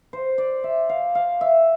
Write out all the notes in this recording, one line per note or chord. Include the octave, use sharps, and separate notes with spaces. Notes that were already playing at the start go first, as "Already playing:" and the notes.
C5
D5
E5
F5
F5
E5